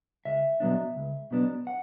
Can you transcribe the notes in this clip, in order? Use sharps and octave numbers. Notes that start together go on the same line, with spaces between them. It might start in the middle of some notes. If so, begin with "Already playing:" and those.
C#2 E5
B2 F#3 B3 D4
C#2
B2 F#3 B3 D4
F#5